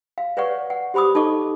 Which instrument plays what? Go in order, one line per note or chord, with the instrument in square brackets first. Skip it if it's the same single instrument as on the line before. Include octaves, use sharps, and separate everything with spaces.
[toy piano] F5
B4 C#5 D5 F#5 C#6
F#5
G4 C5 B5 D6 D#6
D#4 A4 D#5 C#6 D6